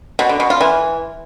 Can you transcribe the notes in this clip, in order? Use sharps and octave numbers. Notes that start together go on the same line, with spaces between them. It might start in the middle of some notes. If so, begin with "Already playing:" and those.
B2
D3
B2
F4
E3